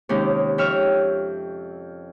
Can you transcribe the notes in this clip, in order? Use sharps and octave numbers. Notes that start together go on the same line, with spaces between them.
D#2 C3 G#3 C#4 D#4
F2 G4 C#5 E5 F6